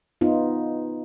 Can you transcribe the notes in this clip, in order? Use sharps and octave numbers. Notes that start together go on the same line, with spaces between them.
B3 D#4 F4